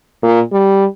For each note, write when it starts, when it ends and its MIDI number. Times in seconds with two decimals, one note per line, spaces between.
0.22 0.41 46
0.52 0.85 55